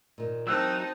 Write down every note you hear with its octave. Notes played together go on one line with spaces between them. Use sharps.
A#2 D#3
E3 F#3 A#3 C4 D#4 A5 E6 F#6